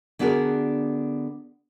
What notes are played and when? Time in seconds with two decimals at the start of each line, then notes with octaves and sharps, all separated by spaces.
0.19 D3 B3 D4 F#4 G#4 A#4